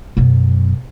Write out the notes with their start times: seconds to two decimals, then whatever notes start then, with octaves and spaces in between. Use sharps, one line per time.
0.17 F#2 B2